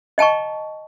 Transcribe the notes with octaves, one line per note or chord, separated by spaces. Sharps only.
D#5 G5 A5 A#5 C#6